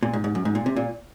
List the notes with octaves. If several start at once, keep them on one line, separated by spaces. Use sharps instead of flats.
A#2
G#2
G#2
F#2
G#2
A#2
C3
A#2